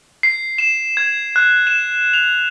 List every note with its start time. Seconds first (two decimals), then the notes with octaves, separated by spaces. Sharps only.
0.23 C7
0.58 E7
0.97 G#6
1.36 F#6
1.67 E7
2.13 F7